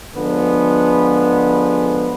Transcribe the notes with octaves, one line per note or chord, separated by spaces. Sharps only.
D3 F3 G#3 B3